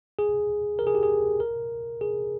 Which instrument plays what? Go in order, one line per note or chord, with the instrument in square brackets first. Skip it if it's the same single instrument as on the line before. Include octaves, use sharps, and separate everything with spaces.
[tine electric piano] G#4
A#4
G#4
G4
G#4
A#4
G#4